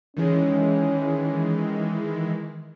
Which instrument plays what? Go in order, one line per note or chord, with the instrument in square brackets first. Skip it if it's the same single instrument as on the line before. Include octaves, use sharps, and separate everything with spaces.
[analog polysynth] D#3 E3 G#3 [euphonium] C#4